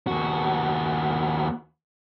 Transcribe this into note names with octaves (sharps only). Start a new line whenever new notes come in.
D#2 F#4